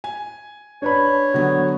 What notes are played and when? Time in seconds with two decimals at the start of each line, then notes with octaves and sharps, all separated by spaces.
0.04 G#5
0.82 D4 B4 C#5 B5
1.34 D3 F#3 B3